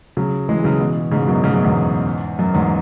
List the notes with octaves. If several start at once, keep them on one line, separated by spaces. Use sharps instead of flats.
C#3 F#3
E3 G#3
C#3 F#3
B2 E3
G#2 C#3
F#2 B2
G#2 C#3
F#2 B2
E2 G#2
F#2
E2 G#2